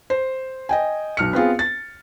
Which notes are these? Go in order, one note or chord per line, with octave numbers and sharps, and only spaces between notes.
C5
D#5 G5 G#5
B1 F6 C#7
B3 C4 F4 G#4
A6